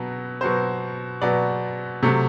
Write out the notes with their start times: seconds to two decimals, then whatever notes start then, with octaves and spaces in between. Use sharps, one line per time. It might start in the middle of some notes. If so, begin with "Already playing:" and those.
Already playing: B2 F#3 B3
0.41 B2 F#3 B3 C5
1.22 B2 F#3 B3 D5
2.03 C3 F#3 A3